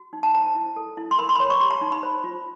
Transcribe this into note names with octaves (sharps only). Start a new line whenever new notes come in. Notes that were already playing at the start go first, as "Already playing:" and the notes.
Already playing: F#4
D#4
A5
C5 A#5
E4
A4
E4
C6
A#4 B5
C6
B5
C#5 C6
C#6
G4 C6
A#5
D#4
B5
C5
F4